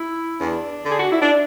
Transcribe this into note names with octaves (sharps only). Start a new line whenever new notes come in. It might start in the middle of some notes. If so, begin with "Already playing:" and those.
Already playing: E4
E2 D4
D3 G#4
F#4
E4
D4